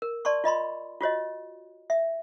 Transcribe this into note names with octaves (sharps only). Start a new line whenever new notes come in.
A#4
D5 A5 C6 C#6
F4 D#5 B5 C6
F4 F#4 C#5 D#5
E5